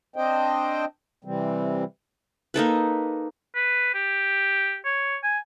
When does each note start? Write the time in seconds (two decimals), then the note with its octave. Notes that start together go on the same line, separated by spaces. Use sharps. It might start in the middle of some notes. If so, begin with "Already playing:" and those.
0.16 C4 D4 C5 D#5 G5
1.24 C3 E3 G3 C4
2.54 A#3 D#4 A4 B4
3.55 B4
3.95 G4
4.85 C#5
5.23 G#5